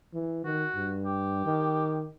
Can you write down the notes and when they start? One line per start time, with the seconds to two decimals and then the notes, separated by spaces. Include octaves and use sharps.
0.14 E3
0.45 D#3 F#4
0.75 G2
1.05 G4
1.45 D#3